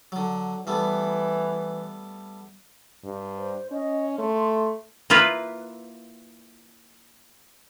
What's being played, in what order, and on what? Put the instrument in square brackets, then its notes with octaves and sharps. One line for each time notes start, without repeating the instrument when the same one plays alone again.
[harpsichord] D3 F#3
[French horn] E3 [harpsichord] G3 A3 B3
[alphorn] G2
[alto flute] C5
[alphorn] C#4 [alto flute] D#5
[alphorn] A3 [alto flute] C6
[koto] A#3 E4 F4 B4